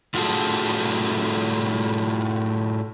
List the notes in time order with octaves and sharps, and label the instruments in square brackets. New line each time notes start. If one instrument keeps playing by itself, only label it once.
[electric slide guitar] A2 F4 F#4 G#4 A4 A5